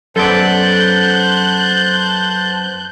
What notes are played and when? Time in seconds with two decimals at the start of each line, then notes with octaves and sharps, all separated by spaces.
0.16 F#2 B3 A4 C5 D5 A5 F#6 G6